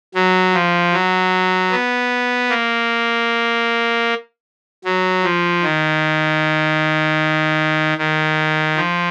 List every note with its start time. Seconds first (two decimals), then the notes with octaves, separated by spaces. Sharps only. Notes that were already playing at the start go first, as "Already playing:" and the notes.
0.15 F#3
0.54 F3
0.93 F#3
1.71 B3
2.50 A#3
4.85 F#3
5.24 F3
5.63 D#3
7.98 D#3
8.76 F3